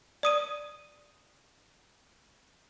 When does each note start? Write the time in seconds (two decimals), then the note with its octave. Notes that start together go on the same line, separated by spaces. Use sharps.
0.23 D5 D#6 D#7